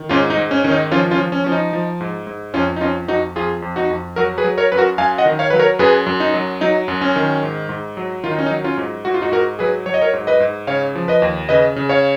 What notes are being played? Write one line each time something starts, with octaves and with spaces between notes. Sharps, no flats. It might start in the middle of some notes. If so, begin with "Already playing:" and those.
Already playing: D#3
G#2 C#4 F4
D#4
G#2
C#4
D#3 C#4
D#4
F3 C#4 F4
C#4 F4
F3
C#4
F3 C#4
D#4
F3
G#2
G#2
F2 C#4 F4
D#4
F2 C#4 F4
F2 D#4 F#4
F2 F4 G#4
F2
D#4 F#4
F2
F#3 F#4 A#4
G#4 B4
F#3
A#4 C#5
F#2 B4
F#4 A#4
F#2 F5 G#5
D#5 F#5
D#3
C#5 F5
F#3 B4
A#4 C#5
F#2 G#4 B4
F#2
D#4
F#3
F#3 D#4
F#2
C#4
D#3
G#2
G#2
F#3
D#3 F4
D#4
C#4
D#4
F#3
C#4 F4
G#2
G#2 F#4
F4
D#4 F#4
G#2 F#4 A#4
F#3 G#4 B4
F#3 C#5
D#5
A#4 C#5
G#2
B4 D#5
G#2
C#3 C#5 F5
F3
B4 D#5
D#2
C#3 B4 D#5
C#3
C#5 F5